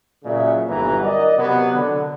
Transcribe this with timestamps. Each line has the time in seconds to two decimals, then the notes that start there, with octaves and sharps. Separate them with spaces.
0.24 A#2 C#3 F#3 D5 E5
0.68 G1 E3 F#3 B3 A#5
1.04 A#4 D5 D#5
1.37 C3 F#3 B3
1.74 D3